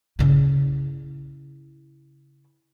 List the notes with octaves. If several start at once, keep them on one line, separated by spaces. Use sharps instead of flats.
C#3 E4